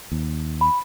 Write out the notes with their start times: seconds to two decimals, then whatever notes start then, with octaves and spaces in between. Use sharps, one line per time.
0.12 D#2
0.61 B5